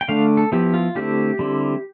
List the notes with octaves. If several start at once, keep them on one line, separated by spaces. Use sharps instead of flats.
G5
D3 A3 D4 F5
A4
F3 B3 E4 G4
F4
D3 A3 C4 E4 G4
D3 G3 C4 E4